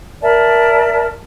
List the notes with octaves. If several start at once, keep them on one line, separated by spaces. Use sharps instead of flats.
A#4 D5 E5 A5